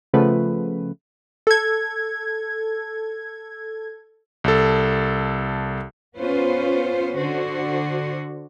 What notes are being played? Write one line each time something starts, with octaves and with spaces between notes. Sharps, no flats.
C#3 F3 A3 B3 B4
A4 G#6
C2 A4
B3 C#4 F4 B4 C5
D3 F#4 C5